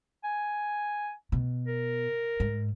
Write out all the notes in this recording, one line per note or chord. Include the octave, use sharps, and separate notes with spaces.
G#5
B2
A#4
G#2